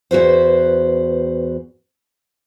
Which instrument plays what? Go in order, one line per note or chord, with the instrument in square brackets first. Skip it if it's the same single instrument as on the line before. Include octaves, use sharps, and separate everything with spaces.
[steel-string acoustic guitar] E2 F#4 B4 C5